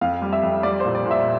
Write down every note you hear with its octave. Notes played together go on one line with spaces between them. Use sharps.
F2 F5
G3
E5
F2
G3 D5
C5
A#2
D5
A#2 E5